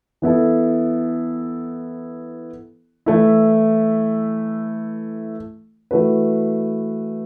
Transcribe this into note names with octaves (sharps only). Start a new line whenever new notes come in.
E3 B3 E4 A4
E3 A3 E4
E3 A3 F#4 B4